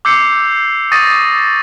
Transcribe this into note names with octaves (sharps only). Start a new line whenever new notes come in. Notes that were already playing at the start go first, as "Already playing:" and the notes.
D6 E6 G6 C7 C#7
C#6 D#6 A6 A#6 C#7 D#7